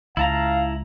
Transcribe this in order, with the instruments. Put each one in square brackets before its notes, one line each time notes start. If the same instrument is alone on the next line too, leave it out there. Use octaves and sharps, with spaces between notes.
[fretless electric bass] C#2 [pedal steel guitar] E4 A5 A#5 [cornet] F5